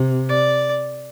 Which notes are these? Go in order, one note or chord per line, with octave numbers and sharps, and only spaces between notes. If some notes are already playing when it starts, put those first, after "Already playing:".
Already playing: C3
D5